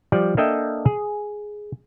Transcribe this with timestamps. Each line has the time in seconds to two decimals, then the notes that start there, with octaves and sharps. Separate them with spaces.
0.12 F3 G3 D5
0.37 A#3 D4 A4 D#5 E5 G5
0.85 G#4